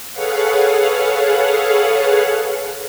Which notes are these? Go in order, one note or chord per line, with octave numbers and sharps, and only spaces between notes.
G#4 A4 B4 C#5 F5 F#5